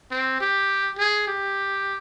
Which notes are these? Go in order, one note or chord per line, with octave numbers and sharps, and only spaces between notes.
C4
G4
G#4
G4